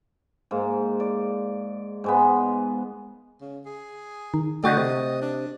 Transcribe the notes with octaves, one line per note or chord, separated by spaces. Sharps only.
G#2 A#3
D5
G#2 G#3 B3
C#3
G#4
D#3
D3 A3 F#4 D#5 G5 A6
C3
D4